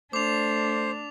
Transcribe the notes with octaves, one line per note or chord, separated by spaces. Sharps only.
A3 D4 C5 D6 F7